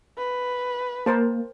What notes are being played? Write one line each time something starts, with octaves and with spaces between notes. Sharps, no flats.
B4
A#3 A#4 C5 A5